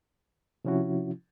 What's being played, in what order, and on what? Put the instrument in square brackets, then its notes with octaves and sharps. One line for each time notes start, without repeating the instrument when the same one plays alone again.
[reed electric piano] C3 F3 C#4 E4 F#4